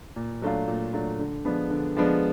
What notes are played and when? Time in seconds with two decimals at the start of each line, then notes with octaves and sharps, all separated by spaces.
0.16 A#2
0.42 F#3 A3 D4 F4
0.68 A#2
0.93 F#3 A3 D4 F4
1.19 D3
1.45 F3 G#3 B3 D4
1.70 D3
1.97 F3 G#3 B3 D4